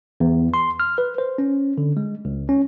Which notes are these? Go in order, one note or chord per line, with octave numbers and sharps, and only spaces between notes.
E2
C6
F6
B4
C5
C#4
D3
G#3
C#2
C#4